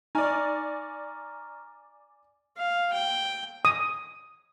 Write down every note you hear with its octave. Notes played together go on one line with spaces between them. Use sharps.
D#4 D5 G#5 A#5 C#6 F6
F5
G5
D#6